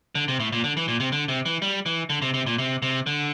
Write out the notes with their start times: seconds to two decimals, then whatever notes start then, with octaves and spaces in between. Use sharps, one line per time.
0.15 D3
0.28 C3
0.40 A2
0.52 A#2
0.64 D3
0.77 E3
0.88 A#2
1.00 C3
1.12 D3
1.28 C3
1.46 E3
1.62 G3
1.86 E3
2.10 D3
2.22 C3
2.34 C3
2.47 A#2
2.58 C3
2.82 C3
3.07 D3